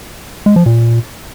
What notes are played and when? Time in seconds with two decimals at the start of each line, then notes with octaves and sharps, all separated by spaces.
0.46 G#3
0.56 F3
0.66 A#2